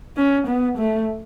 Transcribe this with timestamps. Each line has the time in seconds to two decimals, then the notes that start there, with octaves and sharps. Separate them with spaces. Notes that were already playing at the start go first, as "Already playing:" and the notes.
0.17 C#4
0.47 B3
0.78 A3